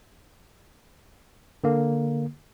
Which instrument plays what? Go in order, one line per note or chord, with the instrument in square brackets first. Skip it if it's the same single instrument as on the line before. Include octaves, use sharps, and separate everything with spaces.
[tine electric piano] D3 A#3